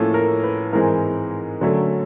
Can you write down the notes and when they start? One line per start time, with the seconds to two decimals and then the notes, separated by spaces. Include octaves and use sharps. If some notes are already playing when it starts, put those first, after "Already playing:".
Already playing: A2 F3 A#3 C#4 A4
0.14 A#4
0.44 B4
0.73 G#2 E3 G#3 C4 A#4
1.61 D3 F#3 A3 C#4